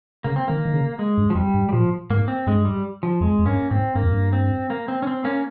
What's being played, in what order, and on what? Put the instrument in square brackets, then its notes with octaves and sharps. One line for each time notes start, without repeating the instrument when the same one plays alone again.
[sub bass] C#3 [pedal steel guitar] A#3
[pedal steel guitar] C4
[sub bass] D#3 [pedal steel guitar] A#3
[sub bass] D#3
C#3
[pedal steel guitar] G#3
[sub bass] G2
[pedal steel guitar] F3
[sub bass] F2 [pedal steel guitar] G3
[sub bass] G2
[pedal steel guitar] G3
[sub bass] A#2 [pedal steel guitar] F3
[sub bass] G#2 [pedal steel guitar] A#3
[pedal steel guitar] C4
[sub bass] G2 [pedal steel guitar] G#3
[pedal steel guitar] G3
F3
[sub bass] F2 [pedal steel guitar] G#3
[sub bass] F2
[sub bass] G2 [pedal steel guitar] A#3 C#4
[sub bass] G#2 [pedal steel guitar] C4
[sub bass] G2 [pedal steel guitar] A#3
[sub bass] F2
G2
[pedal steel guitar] C4
A#3
C4
C#4
C4
A#3 C#4